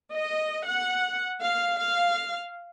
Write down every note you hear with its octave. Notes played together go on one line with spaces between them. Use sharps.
D#5
F#5
F5
F5